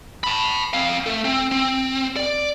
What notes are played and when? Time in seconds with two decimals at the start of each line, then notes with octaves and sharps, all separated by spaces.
0.24 A5 B5
0.73 C4 F5
1.06 A3 A4
1.25 C4
1.51 C4
2.16 D5